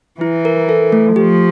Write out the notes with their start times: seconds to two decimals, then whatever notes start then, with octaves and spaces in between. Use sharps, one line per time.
0.20 E3 E4
0.45 A#4
0.69 A4
0.92 A3
1.16 F3 G4